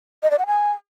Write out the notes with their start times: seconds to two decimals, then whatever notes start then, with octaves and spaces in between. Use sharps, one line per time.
0.23 D#5
0.31 D5
0.39 F#5
0.46 G#5